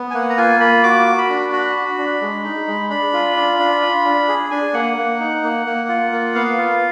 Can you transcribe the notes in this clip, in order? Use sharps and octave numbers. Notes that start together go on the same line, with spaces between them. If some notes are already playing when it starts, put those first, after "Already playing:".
Already playing: B3
G#5
A#3 F#5
A#5
F4 G#5
A#3 B5
F#4 D6
F#4
B5
D4
F#4
F#4
D4
G#3
D#4
G#3
D4 B5
F4
D4
D4
F4
D4
G#4
D4 G#5
A#3 F#5
A#3
D#4
A#3
A#3
F4
A#3
B3 F5
F4